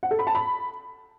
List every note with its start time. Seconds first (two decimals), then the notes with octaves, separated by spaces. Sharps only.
0.03 F#5
0.11 A4
0.19 B5
0.27 A5
0.35 B5